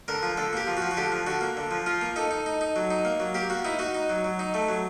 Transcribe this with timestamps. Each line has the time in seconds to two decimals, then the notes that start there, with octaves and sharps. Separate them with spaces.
0.08 D3 A#4
0.23 F3
0.37 D3 A4
0.53 A#3 G4
0.67 F3
0.77 F#4
0.82 F3
0.91 F#4
0.97 D3 G4
1.12 F3
1.27 D3 F#4
1.41 A#3
1.57 D3
1.71 F3
1.86 F3 F4
2.01 A#3
2.16 D#4 A4
2.31 D#4
2.46 D#4
2.61 D#4
2.76 F#3
2.91 D#4
3.05 A#3
3.20 F#3
3.35 A#3 G4
3.50 A#3 F#4
3.65 D#4 E4
3.79 D#4 F#4
3.95 D#4
4.09 F#3
4.24 F#3
4.39 D#4
4.54 A3
4.69 F#3